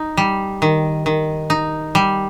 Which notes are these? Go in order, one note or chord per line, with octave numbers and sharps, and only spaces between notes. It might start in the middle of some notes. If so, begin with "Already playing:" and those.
Already playing: D#4
G3
D#3
D#3
D#4
G3